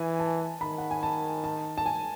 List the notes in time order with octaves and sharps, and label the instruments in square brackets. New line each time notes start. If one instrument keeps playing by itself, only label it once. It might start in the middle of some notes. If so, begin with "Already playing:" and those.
Already playing: [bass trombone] E3 [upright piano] G#5
[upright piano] A5
[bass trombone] D#3 [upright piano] B5
[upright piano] F#5
G#5
A5
A5
A5
G#5